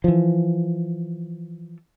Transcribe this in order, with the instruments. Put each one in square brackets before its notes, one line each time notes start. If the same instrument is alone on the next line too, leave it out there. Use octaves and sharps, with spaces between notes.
[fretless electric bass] E3 F3